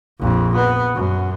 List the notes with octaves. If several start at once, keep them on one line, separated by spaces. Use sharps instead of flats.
A#1 F2
B3
F#2